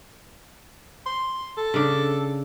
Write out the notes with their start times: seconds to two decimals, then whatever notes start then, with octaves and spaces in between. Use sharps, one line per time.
1.06 C6
1.58 A4
1.74 C#3 D4